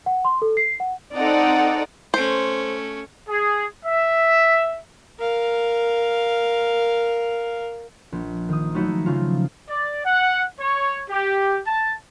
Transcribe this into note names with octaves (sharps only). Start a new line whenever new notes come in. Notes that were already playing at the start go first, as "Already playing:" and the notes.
F#5
C6
A4
C7
F#5
C4 D#4 A4 D5 F#5 A#5
A3 C#4 C5
G#4
E5
A#4 F5
A#1
D#3 D#6
F3 F#3 A3 D#4 E4 F#4
C#3 F3 F4
D5
F#5
C#5
G4
A5